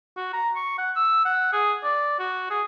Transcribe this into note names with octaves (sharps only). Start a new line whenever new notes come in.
F#4
A#5
C#6
F#5
E6
F#5
G#4
D5
F#4
G#4